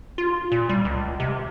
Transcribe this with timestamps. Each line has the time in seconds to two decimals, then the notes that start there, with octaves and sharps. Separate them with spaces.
0.18 F4
0.52 A#2
0.69 G3
0.85 C#2
1.20 C3